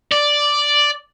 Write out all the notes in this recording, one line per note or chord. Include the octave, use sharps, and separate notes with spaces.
D5